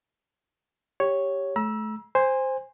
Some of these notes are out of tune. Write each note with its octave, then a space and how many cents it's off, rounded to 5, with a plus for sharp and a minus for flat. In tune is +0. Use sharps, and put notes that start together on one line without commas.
G4 +0 C#5 +0
A3 -30 A#5 +45 E6 +0
C5 +0 G#5 -25